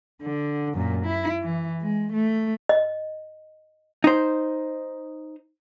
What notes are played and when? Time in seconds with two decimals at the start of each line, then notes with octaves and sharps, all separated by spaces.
0.22 D3
0.74 F#2 A#2
1.06 E4
1.42 E3
1.82 G#3
2.13 A3
2.69 D#5
4.04 D#4 C5